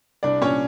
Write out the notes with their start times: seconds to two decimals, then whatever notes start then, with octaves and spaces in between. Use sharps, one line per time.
0.23 C2 D4 D5
0.42 A#2 C#4 C#5